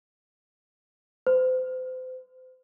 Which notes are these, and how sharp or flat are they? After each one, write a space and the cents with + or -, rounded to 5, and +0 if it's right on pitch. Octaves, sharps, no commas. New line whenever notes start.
C5 -35